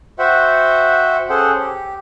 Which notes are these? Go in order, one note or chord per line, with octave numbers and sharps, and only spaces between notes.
F#4 C5 E5 F#5 G5
C#4 G#4 A4 C5 F#5 G5
G4